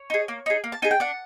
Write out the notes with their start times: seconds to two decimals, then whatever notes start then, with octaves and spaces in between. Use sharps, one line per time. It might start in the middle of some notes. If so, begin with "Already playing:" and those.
Already playing: C#5
0.10 D#4 G#4
0.28 A#3
0.46 D#4 G#4
0.64 A#3
0.72 A5
0.82 D#4 G#4 G#5
0.91 G5
1.00 D4 F#5